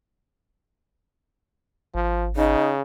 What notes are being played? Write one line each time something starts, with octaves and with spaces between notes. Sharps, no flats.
G#1 F3
C#3 D#4